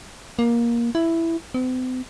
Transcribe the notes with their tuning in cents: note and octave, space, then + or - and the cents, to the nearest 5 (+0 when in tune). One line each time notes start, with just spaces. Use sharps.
A#3 +15
E4 +5
C4 -45